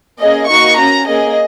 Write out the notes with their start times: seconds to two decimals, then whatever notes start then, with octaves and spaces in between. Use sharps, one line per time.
0.20 A#3 C#4 G#4 D#5
0.49 A#3 D#4 F#4 C#6
0.78 C#4 F#4 A#5
1.06 A#3 C#4 G#4 D#5